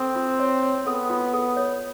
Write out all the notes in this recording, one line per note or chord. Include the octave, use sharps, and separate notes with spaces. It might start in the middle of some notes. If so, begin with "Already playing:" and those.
Already playing: C4 A4
F4
C#5
C#5
B3 A4
F4
A4
C#5